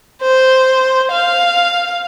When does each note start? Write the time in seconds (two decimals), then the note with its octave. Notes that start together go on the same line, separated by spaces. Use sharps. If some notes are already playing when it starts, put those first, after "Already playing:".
0.22 C5
1.11 F5